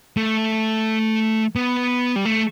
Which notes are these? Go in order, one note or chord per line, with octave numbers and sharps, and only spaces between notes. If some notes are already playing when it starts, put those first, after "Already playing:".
A3
B3
G3
A3